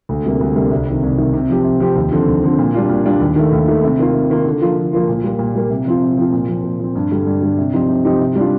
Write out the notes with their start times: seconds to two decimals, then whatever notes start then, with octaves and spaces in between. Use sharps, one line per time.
0.09 D2
0.24 C3 G3 A#3
0.40 D2
0.56 C3 G3 A#3
0.71 C2
0.86 C3 D#3
1.03 C2
1.18 C3 D#3
1.34 C3
1.50 F3 C4 G4
1.64 C3
1.80 F3 C4 G4
1.96 D#2
2.12 D3 F3 C4
2.27 D#2
2.43 D3 F3 C4
2.59 A#2
2.74 G3 D4 F4
2.89 A#2
3.05 G3 D4 F4
3.20 D#2
3.36 D#3 A3
3.52 D#2
3.68 D#3 A3
3.84 C3
3.99 D#3 A#3 F4
4.14 C3
4.30 D#3 A#3 F4
4.46 D3
4.61 F3 A#3 F4
4.76 D3
4.93 F3 A#3 F4
5.08 A#2
5.24 G3 A#3
5.39 A#2
5.55 G3 A#3
5.70 C3
5.86 F3 C4 F4
6.02 C3
6.17 F3 C4 F4
6.32 A#2
6.48 F3 C4
6.64 A#2
6.80 F3 C4
6.95 G2
7.11 D3 G3
7.27 G2
7.42 D3 G3
7.58 C3
7.74 F3 C4 D#4 G4
7.89 C3
8.05 F3 C4 D#4 G4
8.20 C3
8.35 G3 D4 F4